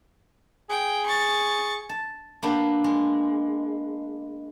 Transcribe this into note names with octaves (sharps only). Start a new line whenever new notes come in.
G#4 G5
C#6 A6
A5
A#3 B3 D4 G4
G#3